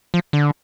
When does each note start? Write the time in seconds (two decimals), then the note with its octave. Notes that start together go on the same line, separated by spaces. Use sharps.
0.14 F3
0.33 D3